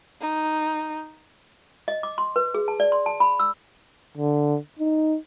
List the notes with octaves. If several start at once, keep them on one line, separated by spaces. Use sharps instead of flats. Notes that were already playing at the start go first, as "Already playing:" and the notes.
D#4
D#5
D6
C6
B4
G#4
A5
D5
C6
A5
B5
E6
D3
D#4